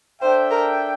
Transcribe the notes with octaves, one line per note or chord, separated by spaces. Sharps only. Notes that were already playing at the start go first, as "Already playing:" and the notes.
D4 A4 C5 E5 G5
A#4